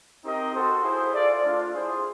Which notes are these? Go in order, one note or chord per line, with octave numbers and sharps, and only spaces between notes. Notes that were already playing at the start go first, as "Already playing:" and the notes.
C4 D#4 G4 A#4 D#5
F#4 A4 C5
E4 G#4 C5
F4 A4 D5
A3 D4 F4
E4 G#4 C5